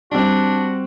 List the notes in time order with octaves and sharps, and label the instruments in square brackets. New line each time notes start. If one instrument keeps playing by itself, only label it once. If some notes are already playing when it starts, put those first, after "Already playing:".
[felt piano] G3 C4 [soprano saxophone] D4 [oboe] F#4